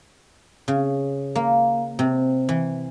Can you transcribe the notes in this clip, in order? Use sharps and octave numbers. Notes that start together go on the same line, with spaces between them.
C#3
A#3
C3
E3